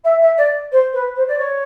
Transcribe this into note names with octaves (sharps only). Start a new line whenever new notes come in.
E5
E5
D5
C5
B4
C5
D5
C#5